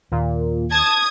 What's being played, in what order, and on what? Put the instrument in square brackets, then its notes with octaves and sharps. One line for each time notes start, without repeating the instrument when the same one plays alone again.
[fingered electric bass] D#2 [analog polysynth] A#2
[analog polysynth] A5 [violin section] D#6 G#6